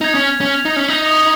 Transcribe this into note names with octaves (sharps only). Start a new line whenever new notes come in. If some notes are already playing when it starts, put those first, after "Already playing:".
D#4 G#6 F7
C#4
C#4
G#6 F7
D#4
C#4
D#4
D#6 C#7 F7